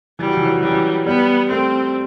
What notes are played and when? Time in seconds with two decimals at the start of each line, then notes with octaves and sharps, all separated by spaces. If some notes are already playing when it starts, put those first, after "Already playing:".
0.19 E3 G3
0.28 F#3
0.37 E3
0.46 F#3
0.54 E3
0.62 F#3 G3
0.72 E3
1.06 G3 B3
1.50 A3 C4